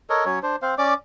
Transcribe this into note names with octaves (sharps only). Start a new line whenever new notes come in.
A4 A#4 C#5 D#5
F#3 C#4 C#5
D4 C5
C4 C5 F5
C#4 D5 D6